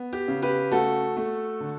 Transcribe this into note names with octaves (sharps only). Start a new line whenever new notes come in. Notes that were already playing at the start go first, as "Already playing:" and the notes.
Already playing: B3
G4
C#3
G4 B4
A3 F#4 A4
A3
D3